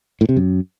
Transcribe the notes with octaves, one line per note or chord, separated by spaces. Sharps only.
A2
C3
F#2